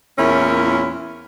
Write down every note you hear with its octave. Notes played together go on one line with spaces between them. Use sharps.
E2 A#2 C#4 E4 A#4 C#5